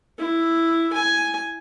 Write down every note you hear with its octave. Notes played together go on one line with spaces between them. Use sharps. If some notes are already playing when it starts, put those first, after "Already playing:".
E4
G#5